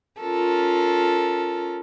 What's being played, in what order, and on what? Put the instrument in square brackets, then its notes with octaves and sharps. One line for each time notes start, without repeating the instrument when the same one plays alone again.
[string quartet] C#4 F4 A4 A#4